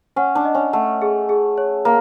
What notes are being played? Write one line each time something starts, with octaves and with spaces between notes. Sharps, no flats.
C#4 F#5
D4
D#5
C#4
A3 F#5
G#4
G#4
C#5
A#3